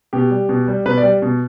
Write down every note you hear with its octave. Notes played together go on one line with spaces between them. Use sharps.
B2 G4
G3
B2
G3
B2 B4
D5
G3
B2